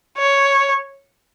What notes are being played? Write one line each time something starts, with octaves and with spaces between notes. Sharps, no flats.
C#5